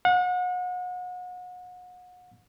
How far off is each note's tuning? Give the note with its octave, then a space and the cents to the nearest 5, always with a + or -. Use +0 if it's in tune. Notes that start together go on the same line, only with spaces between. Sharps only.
F#5 -35